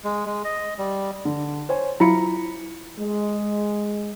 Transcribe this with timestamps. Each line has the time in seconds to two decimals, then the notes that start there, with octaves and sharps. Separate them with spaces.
0.04 G#3
0.26 G#3
0.44 D#5
0.78 G3
1.25 D3
1.69 C5 C#5 G#5
2.00 F#3 E4 F4 A#5 B5 C#7
2.99 G#3